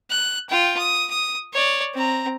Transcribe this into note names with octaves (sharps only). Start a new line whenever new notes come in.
F#6
F4 G5
D#6
D#6
C#5 D5
C4 A#5